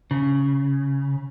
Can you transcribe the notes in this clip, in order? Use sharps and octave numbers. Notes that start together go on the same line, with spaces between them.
C#3